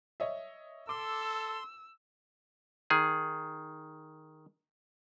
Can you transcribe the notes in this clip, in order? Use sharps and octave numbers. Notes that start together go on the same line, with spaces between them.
C#5 D#5 E5
A4 C6 D6 E6
D#3 G#4